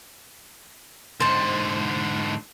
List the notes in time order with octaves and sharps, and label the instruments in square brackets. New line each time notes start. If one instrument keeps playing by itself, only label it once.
[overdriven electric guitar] G#2 D3 [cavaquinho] C5 A5